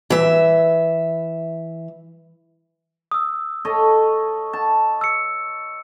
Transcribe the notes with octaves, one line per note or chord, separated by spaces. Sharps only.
E3 E5
D#6 E6
A4 C#5 D#5
A5
E6 C#7